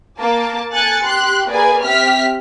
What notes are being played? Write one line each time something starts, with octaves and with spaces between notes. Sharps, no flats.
A#3 A5 D6
A4 G#5 F#6 A6 C#7
G4 C6 F#6
A#3 G#4 B4 D5 G#5
C4 G4 E5 F6 B6